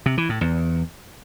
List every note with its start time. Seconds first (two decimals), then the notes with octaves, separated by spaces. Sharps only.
0.06 C3
0.18 E3
0.29 A2
0.41 E2